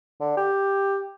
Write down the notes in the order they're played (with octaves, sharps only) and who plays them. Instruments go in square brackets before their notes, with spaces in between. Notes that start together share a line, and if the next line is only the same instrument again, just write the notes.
[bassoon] D3
G4